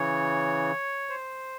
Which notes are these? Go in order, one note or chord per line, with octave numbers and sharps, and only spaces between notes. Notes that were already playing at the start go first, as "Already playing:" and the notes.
Already playing: C#3 E3 C#5
C5